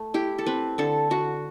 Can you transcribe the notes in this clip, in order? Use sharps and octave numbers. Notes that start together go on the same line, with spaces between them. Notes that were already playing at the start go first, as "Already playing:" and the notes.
Already playing: A3
E4 G4
A4
C4 B4
D3 A4
D3 F#4